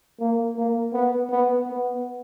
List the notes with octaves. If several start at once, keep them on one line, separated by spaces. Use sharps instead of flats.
A#3
A#3
B3
B3
B3